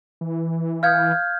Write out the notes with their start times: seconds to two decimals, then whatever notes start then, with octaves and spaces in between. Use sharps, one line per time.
0.21 E3
0.83 F5 G5 D#6 F6 G6 G#6